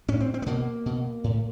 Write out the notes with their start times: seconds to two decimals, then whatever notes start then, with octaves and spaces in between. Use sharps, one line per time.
0.08 A2 C#4
0.20 C4
0.34 C4
0.42 B3
0.46 B2 A#3
0.86 B2
1.24 A2